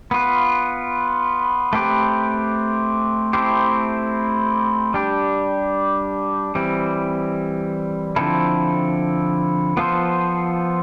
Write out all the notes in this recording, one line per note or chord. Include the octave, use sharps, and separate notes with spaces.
B3 F4 B4
A3 C4 G4 B4
A3 C4 E4 G4 C5
G3 D4 G4
E3 G3 C4
D3 F3 C4 E4 A4
F3 B3 F4 A4 C5